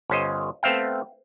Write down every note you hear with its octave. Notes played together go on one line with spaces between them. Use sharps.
G1 C#4 C5 D#5
A3 B3 C4 E5 F5 G5